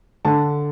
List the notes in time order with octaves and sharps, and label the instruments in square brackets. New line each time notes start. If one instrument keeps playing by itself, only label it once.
[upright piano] D3 A5